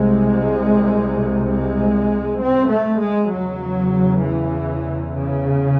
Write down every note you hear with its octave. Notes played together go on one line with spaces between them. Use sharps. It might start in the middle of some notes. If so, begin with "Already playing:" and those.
Already playing: C2 C3 G#3
G#3
C4
A3
G#3
E2 C#3 F#3
E3
C#3